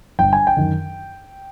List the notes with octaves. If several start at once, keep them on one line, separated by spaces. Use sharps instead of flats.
G1 G5
G#5
G5
F#2 D#3